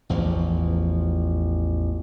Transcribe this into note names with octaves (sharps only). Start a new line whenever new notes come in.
A1 E2 F3